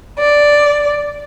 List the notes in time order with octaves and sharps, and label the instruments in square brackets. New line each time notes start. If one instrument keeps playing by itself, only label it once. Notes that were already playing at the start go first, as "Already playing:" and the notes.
[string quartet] D5